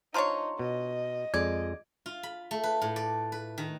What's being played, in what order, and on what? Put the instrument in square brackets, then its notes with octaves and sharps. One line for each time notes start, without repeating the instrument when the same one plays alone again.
[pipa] F3 D4 C#5 [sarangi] D#4 [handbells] A#5 C6
[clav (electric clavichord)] B2 [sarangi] D#5
[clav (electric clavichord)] F2 G#3 [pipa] D5 [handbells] G#6
[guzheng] F4
B5
A3
B4
A2
D5
B4
D#3